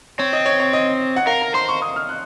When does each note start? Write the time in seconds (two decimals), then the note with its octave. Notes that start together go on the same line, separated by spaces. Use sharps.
0.19 C4 C#5
0.33 D#5
0.46 C#5
0.60 C#5
0.73 D#5
1.16 F#5
1.27 A#4 F5
1.42 A#5
1.54 C5 C6
1.69 C#6
1.82 D#6
1.96 F6
2.09 F#6